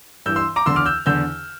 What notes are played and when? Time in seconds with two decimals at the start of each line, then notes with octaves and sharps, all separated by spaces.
0.26 G2 E3 E6 G6
0.36 C6 E6
0.56 A#5 D6
0.66 E2 D3 C6 E6
0.76 D6 F6
0.86 E6 G6
1.06 E2 D3 E6 G6